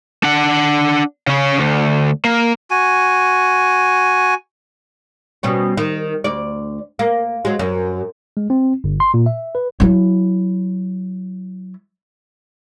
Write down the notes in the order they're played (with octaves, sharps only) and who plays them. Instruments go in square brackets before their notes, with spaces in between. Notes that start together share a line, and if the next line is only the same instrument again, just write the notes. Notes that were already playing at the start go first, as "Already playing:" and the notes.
[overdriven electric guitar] D4 F#5
C#3 C#4
D2
A#3
[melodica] F#4 G#5
[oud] B2 G3 C#4
D#3
D2 D5
A#3
F#3 G#3
F#2
[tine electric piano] G#3
C4
G1
C6
A#2
E5
B4
[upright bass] F#3 E4